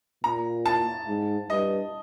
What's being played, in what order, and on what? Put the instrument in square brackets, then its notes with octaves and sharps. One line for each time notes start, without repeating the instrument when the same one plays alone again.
[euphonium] A#2 [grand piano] A#5
[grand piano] A5
[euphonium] G#2
[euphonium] G2 [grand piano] D#5